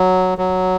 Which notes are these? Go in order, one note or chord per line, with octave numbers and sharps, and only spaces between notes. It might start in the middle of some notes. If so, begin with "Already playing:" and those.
Already playing: F#3
F#3